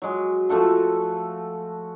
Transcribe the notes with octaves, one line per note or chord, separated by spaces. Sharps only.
F#3 G#3
F3 A3 F#4 A4